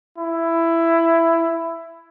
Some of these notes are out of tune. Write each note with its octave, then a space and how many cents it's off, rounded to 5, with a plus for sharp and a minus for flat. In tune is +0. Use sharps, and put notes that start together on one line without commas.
E4 +10